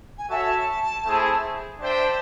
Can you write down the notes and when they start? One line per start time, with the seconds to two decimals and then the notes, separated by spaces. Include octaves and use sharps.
0.17 G#5
0.29 F#4 A4 C#5 E5 A5
1.04 A3 C4 E4 G#4
1.80 D4 G4 C5 E5 G5 A5